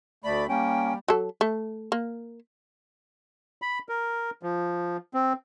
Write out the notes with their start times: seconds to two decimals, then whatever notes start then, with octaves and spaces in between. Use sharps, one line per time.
0.24 D2 A3 D5 B5
0.49 G3 A#3 C#4 G5
1.08 F#3 A4
1.41 A3
1.92 A#3
3.62 B5
3.89 A#4
4.43 F3
5.14 C4